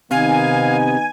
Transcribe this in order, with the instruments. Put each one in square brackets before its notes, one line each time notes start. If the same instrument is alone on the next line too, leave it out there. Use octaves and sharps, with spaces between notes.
[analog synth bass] C3 [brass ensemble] D#3 B3 D#4 [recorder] F5 [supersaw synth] G#5